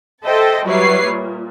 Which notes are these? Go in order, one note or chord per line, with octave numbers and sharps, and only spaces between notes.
A4 C5 D#5 E5 G5 A5
F#3 G3 E4 B4 C#5 C7
A#2